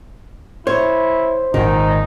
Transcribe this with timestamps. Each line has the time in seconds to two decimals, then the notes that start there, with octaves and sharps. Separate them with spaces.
0.67 E4 C5 C#5
1.54 G#1 A#2 D#3 D#4